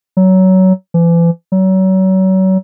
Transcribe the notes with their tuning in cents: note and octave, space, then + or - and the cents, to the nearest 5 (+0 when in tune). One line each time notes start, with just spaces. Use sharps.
F#3 +20
E3 +40
F#3 +35